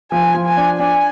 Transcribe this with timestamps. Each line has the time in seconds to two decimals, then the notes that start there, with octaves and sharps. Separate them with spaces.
0.12 F3 G#5
0.35 F3
0.46 G#5
0.57 D4
0.78 D4 G#5